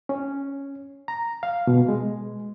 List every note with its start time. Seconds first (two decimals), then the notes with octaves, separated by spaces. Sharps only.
0.09 C#4
1.08 A#5
1.43 F5
1.67 B2
1.88 G#3